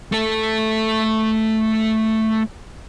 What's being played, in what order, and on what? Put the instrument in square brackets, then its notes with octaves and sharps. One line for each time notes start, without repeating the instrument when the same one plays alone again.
[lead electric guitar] A3 A4